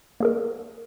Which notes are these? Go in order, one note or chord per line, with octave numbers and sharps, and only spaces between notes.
A#3 G#4 A#4